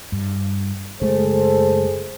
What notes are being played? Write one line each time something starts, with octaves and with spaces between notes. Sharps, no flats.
G2
F#1 G#3 A3 G#4 A4 C5